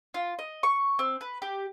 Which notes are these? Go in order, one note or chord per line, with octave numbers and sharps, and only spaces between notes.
F4
D#5
C#6
C4
B4
G4